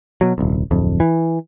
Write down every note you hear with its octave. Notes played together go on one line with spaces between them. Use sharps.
B2 F#3
D#1 C2
D1 F2
E3